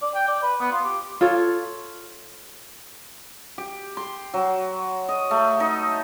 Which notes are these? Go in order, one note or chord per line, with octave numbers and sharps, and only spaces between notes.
D5
G5
D5
B4
B3
F4
G4
F4 A4 C#5
G4
C6
F#3
D#5
A3
D#4